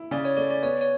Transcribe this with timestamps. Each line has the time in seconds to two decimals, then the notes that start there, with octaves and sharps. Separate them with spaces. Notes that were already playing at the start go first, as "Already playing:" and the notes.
Already playing: E4
0.11 C#3 D5
0.25 C#5
0.37 A3 D5
0.50 D5
0.62 B3 C#5
0.81 C#5